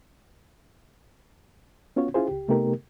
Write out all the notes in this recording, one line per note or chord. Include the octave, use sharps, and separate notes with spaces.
B3 C#4 F4 F#4 C#5
C#4 E4 F4 G#4 C5
C#2 G4
C3 A3 B3 D#4 G4 A#4